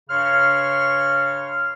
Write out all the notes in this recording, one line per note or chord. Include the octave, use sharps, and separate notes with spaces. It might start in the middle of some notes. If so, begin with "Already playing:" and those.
G2 C#3 C#5 C6 C#6 F6